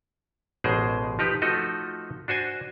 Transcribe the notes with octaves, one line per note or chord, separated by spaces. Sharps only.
A1 B2 G#3 G#4 C5 G5
F3 D#4 G4 B4
F3 A3 D#4 F#4 A4 D#5
D4 F#4 C5 G#5